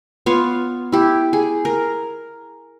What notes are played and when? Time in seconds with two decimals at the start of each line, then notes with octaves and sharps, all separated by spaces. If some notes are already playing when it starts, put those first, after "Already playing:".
0.26 B3 F4 C#5 F5
0.92 E4 G4
1.33 G#4
1.65 A#4